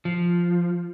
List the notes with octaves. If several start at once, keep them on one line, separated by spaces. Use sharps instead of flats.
F3